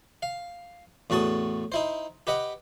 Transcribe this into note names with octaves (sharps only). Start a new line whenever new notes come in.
F5
E2 A2 F#4 A5 D#6
D#4 E4 C5
G4 B4 D#5 F#5